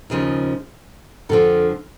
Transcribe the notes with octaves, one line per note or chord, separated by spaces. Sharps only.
D#2 C#3 F3 G#4
F2 D3 F3 A4